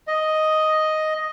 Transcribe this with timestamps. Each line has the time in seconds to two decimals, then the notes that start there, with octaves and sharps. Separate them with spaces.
0.08 D#5